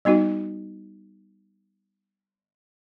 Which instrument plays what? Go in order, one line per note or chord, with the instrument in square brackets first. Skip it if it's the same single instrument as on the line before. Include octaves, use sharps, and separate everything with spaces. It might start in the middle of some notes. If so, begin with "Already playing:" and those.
[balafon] G3 B3 D#4 F#4